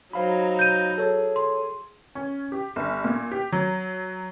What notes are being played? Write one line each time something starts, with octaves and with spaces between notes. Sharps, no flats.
F#3 D#4 C5 F5 B5
G6 D#7
G#4 A4 C#5
C6
C#4
G4
G1
A#2
G4
F#3